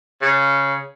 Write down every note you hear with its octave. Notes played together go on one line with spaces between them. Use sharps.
C#3